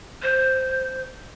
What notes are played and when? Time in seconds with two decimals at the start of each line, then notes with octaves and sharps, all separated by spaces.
0.22 C5